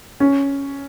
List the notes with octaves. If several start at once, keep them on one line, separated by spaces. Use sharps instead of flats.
C#4